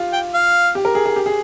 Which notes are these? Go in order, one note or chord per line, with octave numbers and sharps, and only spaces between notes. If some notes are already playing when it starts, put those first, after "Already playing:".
Already playing: F4 G4
G5
F5
G4
A#4
G#4
G#4
G4
G#4